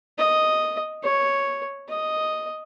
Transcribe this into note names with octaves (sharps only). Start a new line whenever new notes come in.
D#5
C#5
D#5